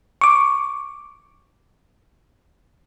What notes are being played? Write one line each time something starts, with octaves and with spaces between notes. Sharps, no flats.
C#6 D6